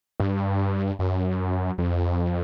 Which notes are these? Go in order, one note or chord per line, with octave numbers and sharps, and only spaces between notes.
G2
F#2
F2